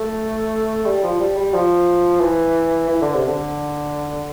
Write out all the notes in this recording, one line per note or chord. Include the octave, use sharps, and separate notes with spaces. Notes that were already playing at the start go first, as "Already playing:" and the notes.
Already playing: A3
G3
F3
G3
G3
F3
E3
E3
D3
C3
D3